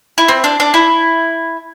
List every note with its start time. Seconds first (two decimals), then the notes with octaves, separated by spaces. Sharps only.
0.18 E4
0.28 C4
0.44 D4
0.60 D4
0.74 E4